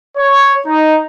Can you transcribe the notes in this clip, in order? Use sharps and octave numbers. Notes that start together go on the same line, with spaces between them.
C#5
D#4